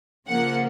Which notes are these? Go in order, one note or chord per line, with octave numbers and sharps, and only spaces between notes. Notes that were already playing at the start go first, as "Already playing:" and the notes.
C#3 F3 A#3 F#5